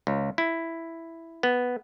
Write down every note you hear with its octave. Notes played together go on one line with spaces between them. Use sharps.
C#2
E4
B3